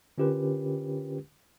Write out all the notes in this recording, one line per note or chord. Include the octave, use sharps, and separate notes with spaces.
D3 C#4 F4 G4 A#4 B4